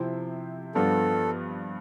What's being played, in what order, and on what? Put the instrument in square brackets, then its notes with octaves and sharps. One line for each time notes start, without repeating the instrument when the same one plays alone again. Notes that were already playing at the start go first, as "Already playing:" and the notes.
Already playing: [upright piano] C3 F3 C4 E4
[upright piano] G2 F3 B3 D4 F4 [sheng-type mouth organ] A4